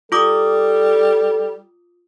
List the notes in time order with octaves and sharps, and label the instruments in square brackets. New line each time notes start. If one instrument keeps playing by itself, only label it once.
[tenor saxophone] G3 [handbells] F4 D6 D#6 [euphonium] A4